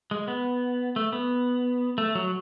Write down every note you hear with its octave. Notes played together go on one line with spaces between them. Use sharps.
G#3
B3
A3
B3
A3
F#3